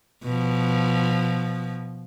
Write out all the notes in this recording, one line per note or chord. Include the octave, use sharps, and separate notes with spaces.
B2 F3